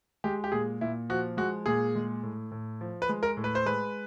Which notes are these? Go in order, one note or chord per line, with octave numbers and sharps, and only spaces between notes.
G#3 G4
G4
A#2 G#4
A#2 E4
F3 F#4
G#3 F#4
A#2 G#4
G#3
A2
A2
F3
B4
G#3
A#4
A2
B4
C5
G#3 B4